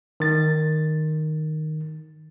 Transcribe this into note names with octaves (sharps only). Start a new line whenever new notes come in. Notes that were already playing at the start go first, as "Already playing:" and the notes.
D#3 A6